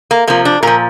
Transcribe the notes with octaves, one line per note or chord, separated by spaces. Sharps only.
A#3
C3 F3 A#3
D4
A#2 F3 A#4